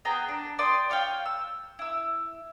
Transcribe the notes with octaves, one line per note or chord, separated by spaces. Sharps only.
B3 G#4 G5 A#5
D4
D5 G5 C6 D#6
F4 C#5 F5 G5
E6
E4 E6